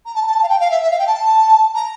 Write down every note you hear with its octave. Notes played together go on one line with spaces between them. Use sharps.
A#5
A5
A#5
A5
A5
F5
G5
F5
E5
E5
F5
G5
A5
A#5